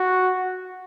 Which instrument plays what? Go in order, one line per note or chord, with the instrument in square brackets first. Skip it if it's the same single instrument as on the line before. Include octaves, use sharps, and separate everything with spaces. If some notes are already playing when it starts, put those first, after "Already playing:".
Already playing: [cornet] F#4